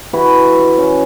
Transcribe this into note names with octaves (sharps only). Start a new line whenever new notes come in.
E3 F#4 B4
C#6
C#4